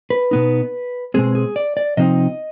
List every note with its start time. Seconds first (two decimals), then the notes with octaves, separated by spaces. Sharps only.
0.10 B4
0.31 B2 B3 D#4
1.14 B2 G#3 C4 G#4
1.35 G#4
1.56 D5
1.77 D5
1.97 C3 F3 C4 D#4 D#5